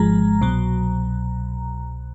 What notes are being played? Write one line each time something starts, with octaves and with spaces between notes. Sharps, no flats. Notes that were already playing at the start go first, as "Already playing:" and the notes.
Already playing: G#1 G#2 F3 G#3 A#5
C2 B2 F#3